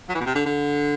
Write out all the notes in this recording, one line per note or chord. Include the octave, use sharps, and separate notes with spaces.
F#3
E3
B2
C3
D3
D3